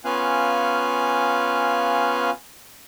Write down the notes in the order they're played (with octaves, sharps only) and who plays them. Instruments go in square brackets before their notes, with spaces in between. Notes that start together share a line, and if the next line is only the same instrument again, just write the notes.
[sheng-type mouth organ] B3 C#4 F4 F5 G#5 F#6